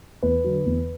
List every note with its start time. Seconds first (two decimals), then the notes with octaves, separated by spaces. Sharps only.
0.23 E2 B4
0.44 D3 F#3
0.66 E2